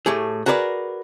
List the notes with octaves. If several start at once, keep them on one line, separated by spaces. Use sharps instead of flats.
A2 A3 G4 G#4
F#4 G#4 A#4 B4 D5